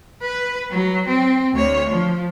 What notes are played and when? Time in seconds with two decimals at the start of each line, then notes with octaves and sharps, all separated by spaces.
0.22 B4
0.70 F#3
1.07 C4
1.53 D2 C#5
1.89 F3